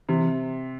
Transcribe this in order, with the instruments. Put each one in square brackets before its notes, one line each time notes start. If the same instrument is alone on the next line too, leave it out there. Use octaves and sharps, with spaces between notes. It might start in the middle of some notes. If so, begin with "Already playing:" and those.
[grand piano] C3 [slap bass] E3